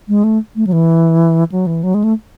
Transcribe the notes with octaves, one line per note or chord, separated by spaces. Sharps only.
G#3
A3
A3
F#3
E3
F#3
E3
F#3
G#3
A3